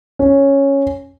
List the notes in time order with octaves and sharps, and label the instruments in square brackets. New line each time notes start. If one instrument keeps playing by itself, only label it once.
[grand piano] C#4